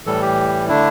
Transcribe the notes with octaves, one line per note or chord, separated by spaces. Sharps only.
A2 E3 G3 A4
G4
D3 A3 D4 E4